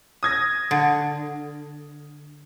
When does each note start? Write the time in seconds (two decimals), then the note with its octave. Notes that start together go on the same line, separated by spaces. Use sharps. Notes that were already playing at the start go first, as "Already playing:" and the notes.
0.23 D#6 G#6 A#6
0.71 D3